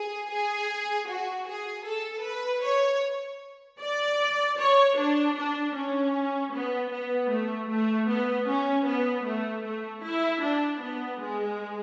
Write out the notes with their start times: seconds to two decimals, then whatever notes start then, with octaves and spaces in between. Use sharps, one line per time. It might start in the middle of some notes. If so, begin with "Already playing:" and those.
Already playing: G#4
0.30 G#4
1.08 F#4
1.47 G#4
1.86 A4
2.25 B4
2.64 C#5
3.81 D5
4.59 C#5
4.98 D4
5.37 D4
5.76 C#4
6.54 B3
6.92 B3
7.31 A3
7.70 A3
8.09 B3
8.48 C#4
8.87 B3
9.26 A3
9.65 A3
10.04 E4
10.43 D4
10.82 B3
11.21 G#3